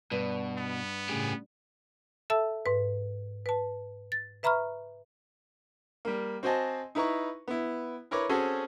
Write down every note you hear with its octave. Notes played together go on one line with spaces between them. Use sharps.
G2 B2
B3
A2 C#3 G4 G#4
A4 E5 A5 E6
G#2 B4
B4 A5
A6
B4 E5 A#5 B5 C#6 F6
G3 A#3
C4 F#4 C5 D#5 G#5 A5
D#4 E4 B4 A#5 C#6
B3 E4
E4 A#4 B4 C#5 C#6 D6
C4 C#4 F#4 G#4 A4 C5